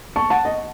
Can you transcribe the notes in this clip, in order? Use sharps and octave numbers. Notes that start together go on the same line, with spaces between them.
A5 C#6
F#5 A5
D#5